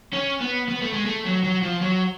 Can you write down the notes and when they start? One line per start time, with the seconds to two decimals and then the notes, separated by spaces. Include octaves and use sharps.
0.13 C#4
0.41 B3
0.69 B3
0.82 A3
0.94 G#3
1.06 A3
1.26 F#3
1.44 F#3
1.63 F3
1.81 F#3